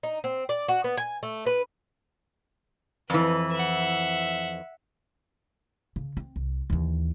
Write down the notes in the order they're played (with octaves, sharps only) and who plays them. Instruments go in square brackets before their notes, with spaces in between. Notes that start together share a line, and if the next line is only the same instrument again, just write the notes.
[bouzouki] D#4
C4
D5
F#4
B3
G#5
A3
B4
[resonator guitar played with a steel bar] F2 E3 [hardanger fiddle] B4
[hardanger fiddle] E5 F#5
[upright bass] C#3
C4
C2
D#2 E3